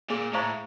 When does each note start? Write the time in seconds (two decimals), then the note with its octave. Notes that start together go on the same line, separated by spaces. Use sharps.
0.10 A#2 G#4
0.34 A2 C5 F5 A#5 C#6